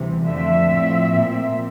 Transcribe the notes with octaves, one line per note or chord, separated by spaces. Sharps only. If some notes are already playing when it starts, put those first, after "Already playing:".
Already playing: D2 C3 E3 G3
F2 D3 F3 A3 C4 E5
A2 F3 C4
A#2 F3 C4